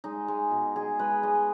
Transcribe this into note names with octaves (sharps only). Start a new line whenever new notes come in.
G#3 D#4
G#3
B2
G#3 G#4
G#3 B4
G#3 D#5